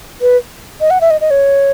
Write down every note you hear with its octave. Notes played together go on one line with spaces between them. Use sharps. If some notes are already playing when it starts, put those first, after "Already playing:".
B4
D#5
F#5
E5
D#5
D#5
C#5